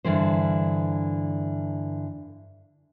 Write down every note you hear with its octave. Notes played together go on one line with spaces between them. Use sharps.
G2 D3 E3 C5